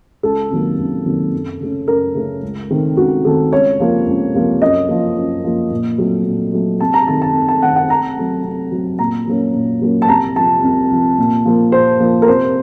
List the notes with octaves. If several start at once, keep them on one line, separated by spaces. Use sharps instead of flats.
C#2 A4
C3 D#3 F#3 A#3
C#2
C3 D#3 F#3 A#3
F#2
C#3 A3 C#4
F#2 A#4
C#3 A3 C#4
C#2
C3 D#3 A3 C4
C#2 F#4
C3 D#3 A3 C4 A4
C#2 C#5
C3 F3 A#3
C#2
C3 F3 A#3
F#2 D#5
F3 A#3
F#2
F3 A#3
A#2
F#3 A3 C4
A#2
F#3 A3 C4
C3 A5
A#5
D#3 A3 C4 A5
A5
C3
A5
D#3 A3 C4 F#5
F#5
C3 A#5
F#3 A3 C4
C3
F#3 A3 C4
A#2 A#5
F#3 A#3 C#4
A#2
F#3 A#3 C#4
A5
C2 A#5
C3 F3 A5
C2
C3 F3
A#2
F3 A#3
A#2 C5
F3 A#3
A#4
C3 C5